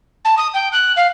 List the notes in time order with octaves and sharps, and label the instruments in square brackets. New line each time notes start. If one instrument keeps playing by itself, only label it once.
[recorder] A5
D#6
G5
F#6
F5